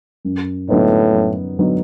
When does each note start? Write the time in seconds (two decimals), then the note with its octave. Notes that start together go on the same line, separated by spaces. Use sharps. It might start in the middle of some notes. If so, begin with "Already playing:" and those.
0.25 F#2
0.69 A2 D3 F#3 B3 D#4
1.14 F#2
1.59 D3 F#3 B3 D#4